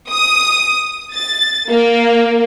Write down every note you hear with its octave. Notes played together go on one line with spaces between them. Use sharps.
D#6
A6
A#3